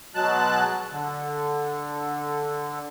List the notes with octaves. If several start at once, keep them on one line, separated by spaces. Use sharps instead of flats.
B2 F#3 G#3 A5 F#6
D3